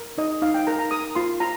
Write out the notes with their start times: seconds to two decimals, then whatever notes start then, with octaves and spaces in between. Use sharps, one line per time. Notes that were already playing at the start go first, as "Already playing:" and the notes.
Already playing: A#4
0.18 D#4 D#5
0.42 D#4 F5
0.54 G5
0.67 A#4 A#5
0.79 A#5
0.91 A#4 D#6
1.15 F4 C6
1.40 F4 A#5